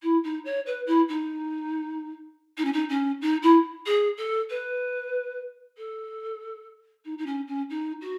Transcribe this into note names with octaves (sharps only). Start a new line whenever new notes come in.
E4
D#4
C#5
B4
E4
D#4
D#4
C#4
D#4
C#4
D#4
E4
G#4
A4
B4
A4
D#4
D#4
C#4
C#4
D#4
F#4